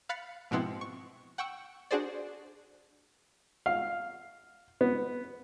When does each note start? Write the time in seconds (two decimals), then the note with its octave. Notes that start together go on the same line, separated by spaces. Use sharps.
0.09 F5 B5 F#6 A6 B6 C#7
0.51 G#2 B2 F3 B3 C4 E4
0.81 C#6
1.38 F#5 G5 C#6 E6
1.91 D4 F#4 G#4 C5 D5
3.66 F5
4.81 B3